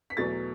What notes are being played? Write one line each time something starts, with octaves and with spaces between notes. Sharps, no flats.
B6
E2 B2 F#3 A3 A6